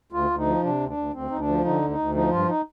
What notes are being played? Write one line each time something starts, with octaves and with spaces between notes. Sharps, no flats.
D2 F4
D2
D#4
F3
C3 D4
D2
D4
D2
D2 C4
D2 D#4
D4
F3
D3 D#4
D2
D#4
D2
F3 D#4
G2 F4
D#4